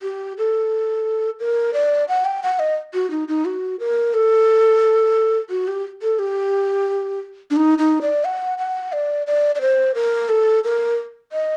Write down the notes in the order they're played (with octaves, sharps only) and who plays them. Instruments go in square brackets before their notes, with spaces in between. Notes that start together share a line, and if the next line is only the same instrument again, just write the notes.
[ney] G4
A4
A#4
D5
F#5
G5
F#5
D#5
F#4
D#4
D#4
F#4
A#4
A4
F#4
G4
A4
G4
D4
D#4
D#4
D5
F#5
F#5
D5
D5
D5
C5
A#4
A4
A#4
D#5